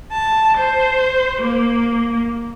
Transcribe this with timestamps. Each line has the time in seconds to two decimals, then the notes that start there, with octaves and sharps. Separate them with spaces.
0.12 A5
0.58 C5
1.41 A#3